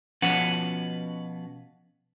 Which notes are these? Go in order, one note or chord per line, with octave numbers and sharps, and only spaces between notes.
B2 F3 C#4 B4 F#5